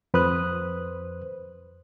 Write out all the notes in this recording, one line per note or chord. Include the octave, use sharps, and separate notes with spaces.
F2 B4 C5 D#6 F#6